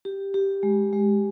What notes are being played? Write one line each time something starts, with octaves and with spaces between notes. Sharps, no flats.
G4
G4
G#3
G#3